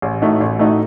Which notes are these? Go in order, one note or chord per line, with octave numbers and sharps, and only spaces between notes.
A1
A2 A3 D#4 F#4
A1
A2 A3 D#4 F#4